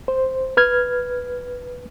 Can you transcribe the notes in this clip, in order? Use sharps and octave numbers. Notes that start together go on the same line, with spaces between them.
C5
B4 F6 G#6